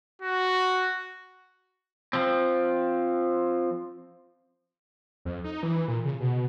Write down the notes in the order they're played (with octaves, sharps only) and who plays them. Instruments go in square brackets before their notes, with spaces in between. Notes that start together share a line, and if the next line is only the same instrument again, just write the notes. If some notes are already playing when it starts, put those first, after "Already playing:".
[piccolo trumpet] F#4
[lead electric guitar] F3 C4
[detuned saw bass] F2
D#4
E3
A#2
C#3
B2